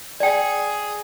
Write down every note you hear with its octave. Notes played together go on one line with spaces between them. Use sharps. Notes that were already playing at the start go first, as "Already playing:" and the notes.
G#4 D5 G5